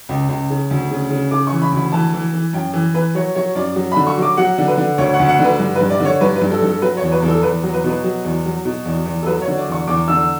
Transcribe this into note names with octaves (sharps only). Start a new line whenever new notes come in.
C#2
C#2
C#3
D2
C#3
C#3
C#3 D6
E3 C#6
B5
D2 B5
E3 A5
E3
E3
F#2 G5
E3
E3 B4
F#3 C#5
F#3 C#5
F#2 D5
F#3
D3 B5
C#6
F#3 D6
F#3 F#5
D3
B4
D3
D2 C#5
F#5
D2
F#5
D3 B4
G2
G2 B4
D5
D3
C#5
G2 B4
B4
G2
A4
G2 A4
F#3 B4
E2 C#5
B4
E2
A4
E2 B4
F#3
B4
B2
B4
F#3
E2
F#3
B2
E2
E2
A4
F#3 B4
C#5
D3
D5
E2 C#6
E2 D6
D3 E6